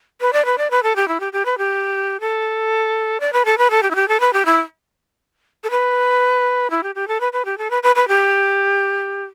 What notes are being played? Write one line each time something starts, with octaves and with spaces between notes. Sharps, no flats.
B4
D5
B4
D5
B4
A4
G4
E4
G4
G4
B4
G4
A4
D5
B4
A4
B4
A4
G4
E4
G4
A4
B4
G4
E4
A4
B4
E4
G4
G4
A4
B4
B4
G4
A4
B4
B4
B4
G4